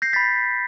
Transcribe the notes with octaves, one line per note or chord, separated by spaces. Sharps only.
G6 A#6 C7
A6 B6
B5